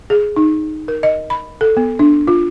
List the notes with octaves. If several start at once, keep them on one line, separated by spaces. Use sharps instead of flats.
G#4
D#4
A#4
D#5
B5
A4
B3
D4
F4